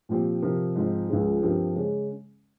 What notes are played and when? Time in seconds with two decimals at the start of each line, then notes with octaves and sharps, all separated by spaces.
0.09 A#2 F3 C4 G4
0.42 C3 F3 C4 G4 A#4
0.75 G#2 F3 C4 D#4
1.09 C#2 C#3 F3 G#3
1.42 G2 F3 C4 G4 A#4
1.76 C#3 G#3 C#4